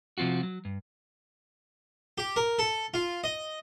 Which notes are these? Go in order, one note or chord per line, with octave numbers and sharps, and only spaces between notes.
C3 F3 C4 F4 F#4
F#3
G2
G4
A#4
A4
F4
D#5